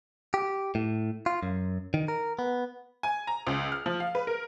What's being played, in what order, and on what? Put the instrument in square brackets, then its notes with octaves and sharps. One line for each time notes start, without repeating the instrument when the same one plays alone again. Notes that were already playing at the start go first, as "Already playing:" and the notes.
[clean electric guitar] G4
A2
F4
F#2
D#3
A#4
B3
[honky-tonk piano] G#5
A#5
C#2
F6
F3
F5
B4
A#4